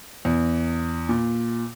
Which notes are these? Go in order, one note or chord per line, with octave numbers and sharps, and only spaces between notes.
E2
A#2